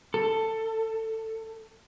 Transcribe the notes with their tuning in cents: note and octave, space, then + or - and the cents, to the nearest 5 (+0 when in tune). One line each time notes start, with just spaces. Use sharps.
A4 +15